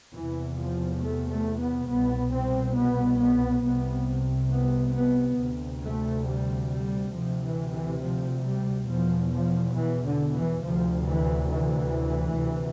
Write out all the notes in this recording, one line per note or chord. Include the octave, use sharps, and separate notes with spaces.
E2 C3 E3
F3
A3
A3
B3
C2 B2 B3
C4
B3
B3
C2 C3 B3
B3
B3
D2 C3
A3
G3
G3
D2 C3 F3
E3
E3
F3
G3
E2 B2 F3
F3
E3
D3
E3
D2 C3 F3
E3
E3
D2 C3